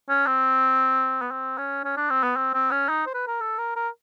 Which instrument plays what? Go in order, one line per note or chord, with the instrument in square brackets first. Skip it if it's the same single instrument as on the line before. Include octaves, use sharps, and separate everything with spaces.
[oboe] C#4
C4
B3
C4
C#4
C#4
D4
C4
B3
C4
C4
C#4
D#4
C5
B4
A#4
A4
A#4
A#4